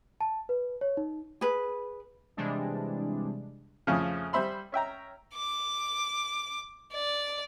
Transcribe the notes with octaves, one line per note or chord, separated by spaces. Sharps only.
A5
B4
C#5
D#4
G#4 B4
C3 E3 G3 G#3 D4
F2 A2 C#3 F3
G3 C5 E5 B5 C6
C#4 E5 G5 A#5
D6
D5